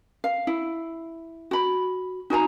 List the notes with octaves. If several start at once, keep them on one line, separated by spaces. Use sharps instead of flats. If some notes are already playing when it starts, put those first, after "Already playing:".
F5
E4
F#4 B5
D#4 F#4 G#5 A#5